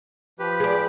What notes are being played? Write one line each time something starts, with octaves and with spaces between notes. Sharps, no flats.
F3 G4 B4
G#4 D5